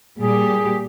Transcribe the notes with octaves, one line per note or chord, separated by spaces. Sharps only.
A#2 G3 G4 G#4